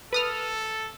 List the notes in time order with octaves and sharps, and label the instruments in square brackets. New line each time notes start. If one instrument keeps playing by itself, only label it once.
[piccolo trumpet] A4 [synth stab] B4 D#6 F6